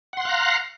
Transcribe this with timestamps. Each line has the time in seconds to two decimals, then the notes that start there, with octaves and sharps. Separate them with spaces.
0.13 F#5
0.17 C6
0.21 F#6
0.25 F5
0.29 A#5